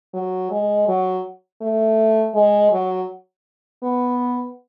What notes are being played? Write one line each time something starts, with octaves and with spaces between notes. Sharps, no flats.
F#3
G#3
F#3
A3
G#3
F#3
B3